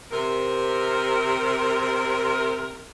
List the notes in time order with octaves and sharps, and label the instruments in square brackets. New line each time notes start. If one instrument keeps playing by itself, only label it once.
[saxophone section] C3 A#4